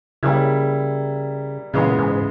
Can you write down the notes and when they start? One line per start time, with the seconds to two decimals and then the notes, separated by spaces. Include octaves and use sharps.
0.23 C#3 G3 A#3 E4
1.73 A#2 C#3 E3 G#3 B3
1.99 G#2